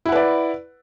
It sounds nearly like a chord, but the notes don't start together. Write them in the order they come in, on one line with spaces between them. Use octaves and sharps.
E4 F#5 B4 D5